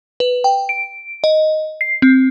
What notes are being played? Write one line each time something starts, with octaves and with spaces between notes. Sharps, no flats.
B4
G5
D7
D#5
C7
C4